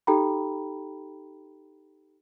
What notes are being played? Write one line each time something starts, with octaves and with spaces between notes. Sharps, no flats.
D#4 G4 A4 G5 A#5 B5